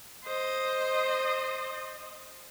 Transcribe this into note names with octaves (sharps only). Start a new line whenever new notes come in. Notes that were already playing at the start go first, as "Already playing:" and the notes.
C5 D#5